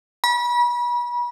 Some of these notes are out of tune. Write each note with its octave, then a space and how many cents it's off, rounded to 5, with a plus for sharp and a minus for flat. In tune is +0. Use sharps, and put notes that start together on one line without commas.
B5 -35